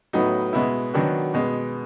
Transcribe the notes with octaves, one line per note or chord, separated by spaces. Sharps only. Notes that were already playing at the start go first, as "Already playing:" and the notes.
A2 F#3 B3 D#4
B2 G#3 B3 E4
D#3 F#3 B3 D4 F#4
B2 G#3 B3